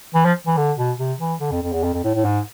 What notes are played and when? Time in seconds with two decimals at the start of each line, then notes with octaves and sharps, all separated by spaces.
0.15 E3
0.25 F3
0.47 E3
0.57 D3
0.77 B2
0.98 C3
1.20 E3
1.40 D3
1.51 F2
1.63 F2
1.73 E2
1.84 F2
1.94 F2
2.04 A2
2.15 A2
2.25 G#2